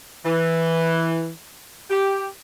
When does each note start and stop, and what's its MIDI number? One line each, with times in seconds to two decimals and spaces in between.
0.24 1.29 52
1.90 2.26 67